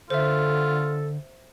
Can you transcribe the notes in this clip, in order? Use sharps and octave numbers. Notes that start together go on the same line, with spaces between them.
D3 F4 A4 C5 E5